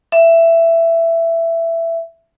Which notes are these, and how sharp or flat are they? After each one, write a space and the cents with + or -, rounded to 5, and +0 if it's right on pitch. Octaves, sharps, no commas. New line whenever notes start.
E5 +15